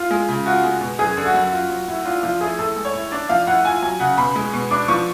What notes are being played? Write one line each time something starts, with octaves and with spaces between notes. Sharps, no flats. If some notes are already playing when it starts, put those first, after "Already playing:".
Already playing: F4
G#3
C#3
F4 F#4
G#3
B2
F#2 G#4
D3
F#4
F#2
F4
F#3
A2
D4 F4
F3 F4
A2 G#4
A2 A4
G#3
C#5
A2
D4 D5
F3 F5
A2 F#5
F4 G#5
F#3 G#5
C#3 F#5
B2 B5
G#3
B2
D4 D6
F3 C#6